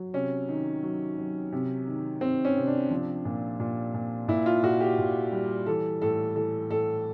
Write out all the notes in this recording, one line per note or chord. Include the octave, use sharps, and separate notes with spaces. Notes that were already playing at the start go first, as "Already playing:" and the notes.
Already playing: F#3
C3 C#4
D#3
F#3
F#3
C3
D#3
C3 C4
C#4
C3
D4
F3
A#2
A#2
A#2
A#2 E4
F4
A#2 F#4
G4
A#2
G3
E3 A4
A2 A4
E3 A4
A2 A4